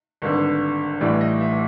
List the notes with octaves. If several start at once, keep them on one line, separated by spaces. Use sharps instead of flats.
G#1 G2 D3
A1 A2 E3 G3 D5
D#5
E5